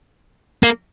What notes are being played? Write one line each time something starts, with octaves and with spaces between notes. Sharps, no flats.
A#3